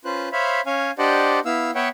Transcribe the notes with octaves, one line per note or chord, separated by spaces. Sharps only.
C#4 F4 B4 C5 F#6
C5 C#5 E5 F5 B5
C#4 C#5 F5 G#5
D4 G4 C5 D5 D#5 F#5
B3 E4 F5 E6
B3 B4 C#5 E5 F#5 G5